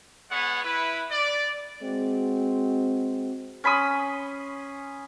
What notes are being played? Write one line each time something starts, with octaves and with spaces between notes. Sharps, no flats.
G#3 B3 B4 C#5 F#5
E4 B4
D5
G#3 C4 F#4
C#4 B5 C6 D#6